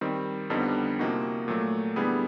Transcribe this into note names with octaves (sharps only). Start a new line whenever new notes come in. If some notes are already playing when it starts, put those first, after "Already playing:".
D#3 G3 C4
F2 D3 G3 B3 D#4
C3 F3 A#3 D#4 F#4
A#2 F#3 A3
D3 G3 B3 E4 G#4